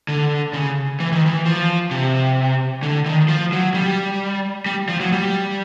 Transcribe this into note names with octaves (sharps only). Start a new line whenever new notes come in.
D3
C#3
E3
D#3
E3
F3
C3
D3
D#3
F3
F#3
G3
G3
F3
F#3
G3